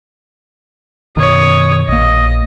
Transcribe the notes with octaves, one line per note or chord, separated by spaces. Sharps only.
F#2 B2 D#3 C#5 D#6
A#1 A#3 D#5